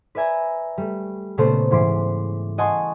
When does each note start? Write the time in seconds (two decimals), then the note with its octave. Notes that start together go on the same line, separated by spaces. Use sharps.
0.15 B4 D5 E5 G#5 A#5
0.77 G3 A3
1.38 A#2 C#3 A3 B3 A4 C5
1.71 G#2 E3 C6 D6 B6
2.58 D#5 F#5 G#5 A5 C6 C#6